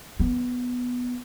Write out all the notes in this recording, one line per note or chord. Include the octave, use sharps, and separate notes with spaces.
B3